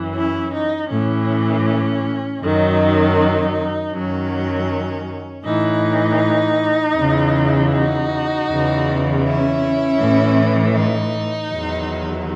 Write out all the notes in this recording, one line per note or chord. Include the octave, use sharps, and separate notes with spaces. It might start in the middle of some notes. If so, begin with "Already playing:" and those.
Already playing: F#2 E3
C#4 E4
D#4
A2 E3 C#4
F#2 D#3 F#3 D#4
F#2 D#3 F#3 C#4
A2 E3 D#4
E2 C#3 E3
D#4 F#4
E2 C#3 E3
C#4 E4
A2 E3
D#4
E2 D#3 F#3